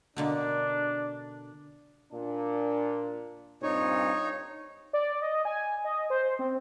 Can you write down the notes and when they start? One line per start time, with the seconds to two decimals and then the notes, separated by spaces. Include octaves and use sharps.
0.16 B2 D3 A#3 D4
2.12 A#2 D4
3.63 G2 A#2 C4 D#4 C#5
4.93 D5
5.22 D#5
5.45 G#5
5.84 D#5
6.10 C5
6.39 C4